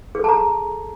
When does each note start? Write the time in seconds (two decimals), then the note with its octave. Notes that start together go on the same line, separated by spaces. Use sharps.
0.15 G#4
0.19 A4
0.24 A5
0.29 A#5